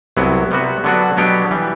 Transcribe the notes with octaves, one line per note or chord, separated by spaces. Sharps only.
C2 C3 F#3 B3 E4
C3 G3 B3 F#4
D3 F#3 B3 D4 F#4
B2 F#3 B3 D4 G4
E3 G3